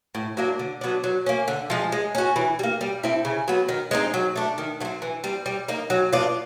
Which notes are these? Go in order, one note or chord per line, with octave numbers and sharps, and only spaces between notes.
A2
F#3 A#3 D4
D3
F#3 B3 D4
F#3
A#3 C#4
D3
F3 G#3
G#3
C#4 F#4
E3
G3
A#3
G3
C4 E4 A4
C#3
F#3 B3
D#3
G#3 C4 D#4
F#3
A3 D4
D#3
F#3 A3 C4
E3
G3 C4
G3
A#3 D#4
F#3
B3 D4 F4